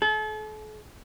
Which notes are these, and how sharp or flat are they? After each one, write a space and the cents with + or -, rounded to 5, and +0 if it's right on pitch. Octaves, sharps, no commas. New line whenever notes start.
A4 -40